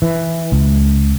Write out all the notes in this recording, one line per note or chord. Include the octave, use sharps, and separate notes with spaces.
E3
C#2